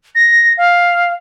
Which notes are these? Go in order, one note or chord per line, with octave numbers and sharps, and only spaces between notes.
A#6
F5